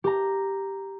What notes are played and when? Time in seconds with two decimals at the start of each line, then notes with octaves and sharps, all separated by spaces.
0.04 G4 A#5